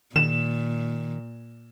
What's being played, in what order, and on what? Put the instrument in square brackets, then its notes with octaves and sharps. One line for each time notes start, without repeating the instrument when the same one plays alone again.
[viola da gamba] A#2 [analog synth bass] D#3 [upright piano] E7